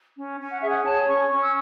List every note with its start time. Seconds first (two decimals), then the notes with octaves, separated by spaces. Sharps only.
0.17 C#4
0.39 C#4
0.51 F#5
0.60 G#4 E5
0.70 F#5
0.85 C#5 A5
1.07 C#4 C#6
1.31 C#4
1.41 E6